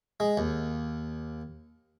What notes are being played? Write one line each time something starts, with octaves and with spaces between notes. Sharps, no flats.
G#3
D#2